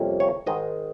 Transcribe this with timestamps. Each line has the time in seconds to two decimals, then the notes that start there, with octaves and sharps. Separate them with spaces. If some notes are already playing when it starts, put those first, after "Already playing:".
Already playing: F2 C3 G3 A#3 C#4
0.20 C#5
0.46 G#2 D#3 G#3 D#5